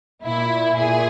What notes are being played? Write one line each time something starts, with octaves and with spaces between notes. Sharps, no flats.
A#2 E4
A#2 G#4